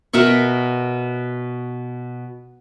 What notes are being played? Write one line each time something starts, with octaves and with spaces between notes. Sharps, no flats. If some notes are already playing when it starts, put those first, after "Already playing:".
B2 A#4 E5 C#6